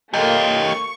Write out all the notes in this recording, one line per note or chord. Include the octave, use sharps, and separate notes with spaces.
A3 A#3 F4 G4 D#5
C#6